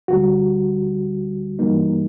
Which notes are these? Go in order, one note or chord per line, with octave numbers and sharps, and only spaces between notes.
D2 D3 G3 F#4
G2 E3 G3 A#3 D#4